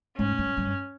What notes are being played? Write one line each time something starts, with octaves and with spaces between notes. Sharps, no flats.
G#2 C#4
G2
G2